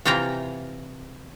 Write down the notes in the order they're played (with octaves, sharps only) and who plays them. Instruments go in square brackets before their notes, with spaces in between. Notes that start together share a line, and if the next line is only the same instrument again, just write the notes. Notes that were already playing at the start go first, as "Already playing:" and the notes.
[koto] C3 E3 F4 G5 A#5